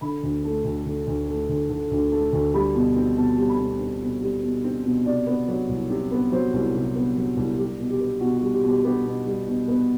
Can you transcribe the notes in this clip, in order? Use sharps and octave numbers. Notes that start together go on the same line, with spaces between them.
D3 B5
D2
A3
D2
D3
D2
A3
D2
D3
D2
A3
D2
G3 B5
B2
C4
B2 A5
G3
B5
B2
C4
B2
G3
B2
C4
B2
C3 D5
B3
F#3
C2
C3
B3
F#3 C5
C2
C3
B3
F#3
C2
G3 G4
B2
G4
B3
B2 F#4
F#4
G3
G4
B2
G4
B3 G4
B2
G3
B2
B3